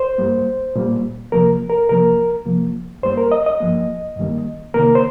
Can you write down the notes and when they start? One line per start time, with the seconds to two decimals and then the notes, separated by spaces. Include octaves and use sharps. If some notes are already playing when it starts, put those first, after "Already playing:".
Already playing: C5
0.18 G2 G3 A#3
0.76 A#2 G3 A#3
1.32 C3 F3 A#3 A#4
1.70 A#4
1.89 C3 F3 A#3 A#4
2.46 C3 F3 A#3
3.03 G2 G3 A#3 C5
3.17 A#4
3.32 D#5
3.46 D#5
3.60 G2 F3 A#3
4.17 G2 D#3 G3 A#3
4.74 C3 D#3 A#3 A#4
4.95 C5